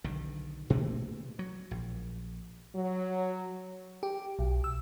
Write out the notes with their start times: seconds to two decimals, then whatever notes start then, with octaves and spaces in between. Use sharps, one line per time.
0.04 B1 D3 D#3
0.70 B2 A3 A#3
1.39 F#3
1.71 A#1
2.75 F#3
4.03 G4
4.39 B1
4.64 E6